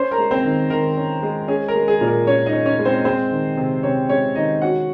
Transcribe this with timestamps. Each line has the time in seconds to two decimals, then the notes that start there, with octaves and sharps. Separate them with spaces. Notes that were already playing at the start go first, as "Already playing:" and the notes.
Already playing: C#4 C5 C6
0.11 A#4 A#5
0.18 G#3
0.31 C4 C5
0.44 D#3
0.70 D#3 A#4
0.97 C#4
1.23 G#3
1.48 C#4 G#4
1.68 A#4
1.75 G#3
1.88 G#4
2.01 A#2
2.07 A#4
2.27 A#2 C#4 C#5
2.46 D#4 D#5
2.53 C#4
2.66 C#4 C#5
2.79 G#3
2.85 C4 C5
3.05 G#3 C4 C5
3.31 D#3
3.57 C3
3.83 C3 C#4 C#5
4.09 G#3 C#4 C#5
4.35 D#3 D#4 D#5
4.62 C#4 F#4 F#5